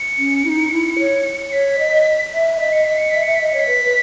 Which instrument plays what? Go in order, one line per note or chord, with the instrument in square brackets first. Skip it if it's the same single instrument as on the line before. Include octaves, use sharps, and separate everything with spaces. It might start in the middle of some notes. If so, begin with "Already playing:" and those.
Already playing: [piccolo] C#7
[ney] C#4
E4
D#4
E4
C#5
[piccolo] C#7
[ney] C#5 [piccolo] B6
[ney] D#5
E5
[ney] D#5 [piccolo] B6
[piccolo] C#7
[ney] D#5 [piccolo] B6
[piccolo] C#7
[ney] E5 [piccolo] B6
[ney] E5 [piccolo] C#7
[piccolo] B6
[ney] D#5
[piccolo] C#7
[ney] C#5
[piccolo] B6
[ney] B4
B4